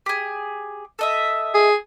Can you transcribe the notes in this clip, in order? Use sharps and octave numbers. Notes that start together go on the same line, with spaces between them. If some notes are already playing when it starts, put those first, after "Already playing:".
G4 G#4
A4 D#5 E5
G#4